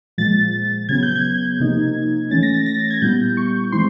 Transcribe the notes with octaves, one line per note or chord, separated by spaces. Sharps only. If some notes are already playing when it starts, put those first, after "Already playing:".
A#2 F3 G#3 A6
C#3 F#3 B3 G#6
G6
G#6
C3 F3 A#3 D#4
E3 A3 C#4 A6
A#6
A6
A#6
A6
G#6
A#2 G3 B3 E4 G6
C#6
E3 G#3 C4 E4 C6